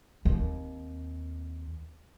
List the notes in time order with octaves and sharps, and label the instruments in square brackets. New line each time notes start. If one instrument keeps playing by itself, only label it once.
[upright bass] D#2 C4